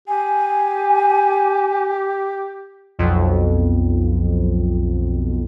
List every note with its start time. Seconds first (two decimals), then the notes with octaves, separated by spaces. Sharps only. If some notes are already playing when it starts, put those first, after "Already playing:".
0.08 G4 G#5
2.99 B1 F2